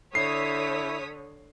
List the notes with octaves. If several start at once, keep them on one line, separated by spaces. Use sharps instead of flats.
D3 E4 C#5 D#6 B6 C7